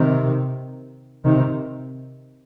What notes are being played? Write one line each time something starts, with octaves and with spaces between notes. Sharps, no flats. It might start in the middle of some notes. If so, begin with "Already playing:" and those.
Already playing: C3 D#3
C3 D#3